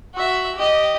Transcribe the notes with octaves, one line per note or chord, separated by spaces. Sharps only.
F#4 E5
G4 D#5